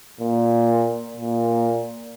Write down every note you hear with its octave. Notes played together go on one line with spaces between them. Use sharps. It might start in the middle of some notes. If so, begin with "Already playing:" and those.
A#2
A#2